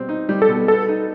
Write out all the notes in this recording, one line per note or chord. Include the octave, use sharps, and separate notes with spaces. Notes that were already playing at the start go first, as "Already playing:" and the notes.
Already playing: B2 G3 C4
D#4
G3
A4
B2
B3 A4
D#4